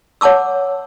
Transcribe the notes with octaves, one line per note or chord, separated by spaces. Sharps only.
C#5 F#5 A5 D6 E6